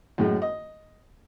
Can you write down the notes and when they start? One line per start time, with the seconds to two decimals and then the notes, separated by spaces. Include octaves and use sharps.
0.18 F#2 A2 G#3
0.42 D#5